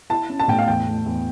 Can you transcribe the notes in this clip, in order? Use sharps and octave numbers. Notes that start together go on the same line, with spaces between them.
E4 A5
C#4
A5
A2 G5
F5
E2 G5
A3
E2